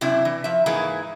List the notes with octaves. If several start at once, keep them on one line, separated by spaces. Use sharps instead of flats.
F#2 C3 D4 E4
E3
F3 E5
G#2 E3 G#3 A#3 E4